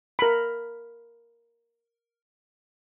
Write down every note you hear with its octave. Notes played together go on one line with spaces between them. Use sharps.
A#4 B5